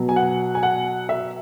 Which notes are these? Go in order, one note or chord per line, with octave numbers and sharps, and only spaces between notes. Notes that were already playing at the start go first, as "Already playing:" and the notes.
Already playing: B2 F#3
G#5
F#5
G#5
F#5
E5